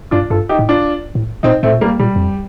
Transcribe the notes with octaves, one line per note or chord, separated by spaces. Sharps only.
G2 D4 F4
G2 F4 A4
D#4 G4
A2
D4 F4
A2
A#2 C4 D#4
A2 A3 C4
A#2
G3 A#3
A#2 G3
F2